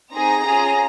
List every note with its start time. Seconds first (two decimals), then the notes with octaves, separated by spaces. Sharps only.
0.13 C4 D#4 G#4 A#5
0.46 C#4 F4 G#4